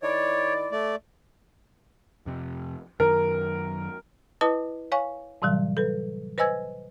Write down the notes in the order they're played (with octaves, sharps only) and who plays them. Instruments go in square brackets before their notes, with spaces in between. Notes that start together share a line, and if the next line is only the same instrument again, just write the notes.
[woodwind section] D#3 E4 D5 [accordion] C#5
[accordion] A3 D5
[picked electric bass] F2 C3
[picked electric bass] F#2 D#3 F#3 [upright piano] A#4
[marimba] E4 B4 D#5 A5 D#6
C#5 F5 G#5 C#6
A2 C3 E3 F#3 G3
A4 B4
B4 C5 D#5 G#5 E6 G#6